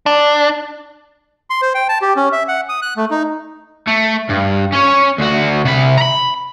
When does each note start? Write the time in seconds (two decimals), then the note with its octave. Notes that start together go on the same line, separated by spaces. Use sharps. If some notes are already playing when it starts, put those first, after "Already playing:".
0.06 D4
1.50 C6
1.62 C5
1.75 G5
1.89 A5
2.02 G4
2.16 C#4
2.32 E5
2.48 F#5
2.69 D#6
2.82 F#6
2.97 A3
3.11 D#4
3.87 A3
4.29 G2
4.72 C#4 C#5
5.18 D2 F#4
5.65 C3 B5
5.98 A#5 B5